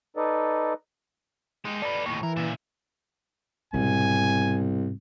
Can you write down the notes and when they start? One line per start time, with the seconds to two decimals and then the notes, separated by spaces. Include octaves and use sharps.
0.17 D#4 A4 B4 D5 D#5
1.65 G#3 D#4 G4
1.82 A4 B4 D5
2.06 D#2 A2 C#6
2.23 E3 A#4
2.37 A#2 C#3 E5
3.74 C2 G#2 B2 G#5